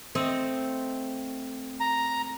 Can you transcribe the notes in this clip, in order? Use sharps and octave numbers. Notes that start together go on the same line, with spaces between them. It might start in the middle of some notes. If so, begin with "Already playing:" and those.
A3 C4 D#5
A#5